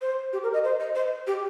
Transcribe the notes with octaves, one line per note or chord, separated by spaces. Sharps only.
C5
G4
A#4
D#5
C5
D#5
C5
G4